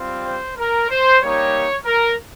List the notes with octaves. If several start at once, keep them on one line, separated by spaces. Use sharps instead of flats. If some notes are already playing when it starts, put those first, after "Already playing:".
Already playing: G3 C4 F4
C5
A#4
C5
G3 A#3 D#4 G4 C#5
A#4